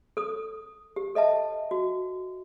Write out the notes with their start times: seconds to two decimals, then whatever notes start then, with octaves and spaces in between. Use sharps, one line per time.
0.17 A4 D#6
0.96 G4
1.15 A4 D#5 E5 A5
1.71 F#4